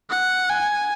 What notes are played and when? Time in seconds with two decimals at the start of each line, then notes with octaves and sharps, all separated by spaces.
0.10 F#5
0.50 G#5